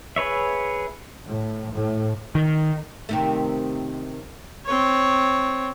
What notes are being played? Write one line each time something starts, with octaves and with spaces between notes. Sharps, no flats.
G#4 B4 C#5 E5
A2
A2
D#3
C3 D#3 A3
C4 C#5